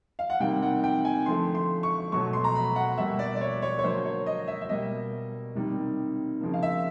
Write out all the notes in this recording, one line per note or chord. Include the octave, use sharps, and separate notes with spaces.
F5
F#5
C3 D#3 G3 A#3 G5
F#5
G5
G#5
D3 F3 A3 C6
C6
C#6
B2 F#3 A3 C#6
C6
A#5
B5
F#5
B2 G3 A#3 E5
D5
D5
C#5
C#5
C#5
D3 F#3 A#3 C5
C#5
D#5
E5
E5
B2 G3 A#3 D#5
C3 D#3 G3 A#3
C#3 F3 A#3
F5
E5